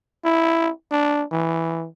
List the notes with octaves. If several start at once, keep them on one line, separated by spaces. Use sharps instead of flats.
E4
D4
E3